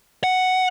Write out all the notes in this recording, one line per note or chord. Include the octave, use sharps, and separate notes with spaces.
F#5